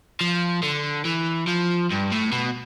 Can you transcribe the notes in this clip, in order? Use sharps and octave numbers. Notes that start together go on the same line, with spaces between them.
F3
D3
E3
F3
G2
A2
B2